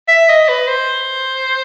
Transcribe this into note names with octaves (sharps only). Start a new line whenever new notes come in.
E5
D#5
B4
C5